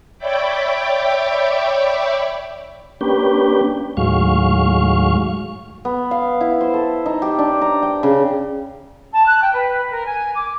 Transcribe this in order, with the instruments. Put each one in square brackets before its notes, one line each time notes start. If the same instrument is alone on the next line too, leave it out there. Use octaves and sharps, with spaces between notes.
[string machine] C#5 D5 E5 G5 B5 D6
[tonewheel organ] A#3 C#4 D4 G4 B4 G5
D#2 A2 F#3 G#3 F5 C#6
[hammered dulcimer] B3
F5
E4
C5
A4
D#4
G4
D4
A#5
G5
C#3
[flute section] A5
F#6
G5
B4
A#4
G#5
D6